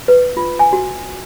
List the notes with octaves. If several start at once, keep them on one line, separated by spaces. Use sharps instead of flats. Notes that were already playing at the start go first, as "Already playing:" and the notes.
B4
F4
G#5
F#4